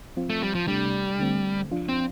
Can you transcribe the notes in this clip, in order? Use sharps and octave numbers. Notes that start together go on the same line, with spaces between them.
F3 C4 F4
A3
G3
F3
C3 G3 A3 D4
D3 A3 C4
F3 D4 F4
C4